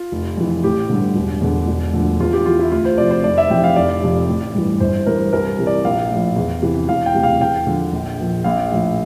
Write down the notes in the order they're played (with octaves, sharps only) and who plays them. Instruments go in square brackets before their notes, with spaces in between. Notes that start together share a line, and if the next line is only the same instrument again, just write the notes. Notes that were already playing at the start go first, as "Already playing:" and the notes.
Already playing: [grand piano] F4
F1
F2 E3
A1 G4
G2 D3
E1
E2 D3
E1
D2 D3 F3
E2 F4
G4
E3 F4
E4
D2 F4
C5
C3 F3 D5
C5
F1 D5
E5
F2 C3 E3 G5
F5
F1 D5
F2 C3 F3
A1
G2 E3
G1 C5
G2 E3 A#4
C2 A#4
C3 E3
D5
A#1 F5
A2 F3
E2
C3 E3
E1 F5
G5
D2 C3 E3
F5
E2 G5
D3 F3
A#1
A#2 F3
A#1 F5
A2 F3